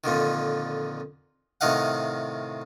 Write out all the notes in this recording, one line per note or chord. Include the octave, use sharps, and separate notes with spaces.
F2 A#2 D3 D#3
A2 C3 D#3 D#5 F5 F#5